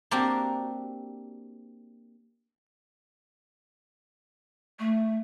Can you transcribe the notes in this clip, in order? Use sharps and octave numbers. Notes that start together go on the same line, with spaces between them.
A#3 C4 D4 F#4 G4
A3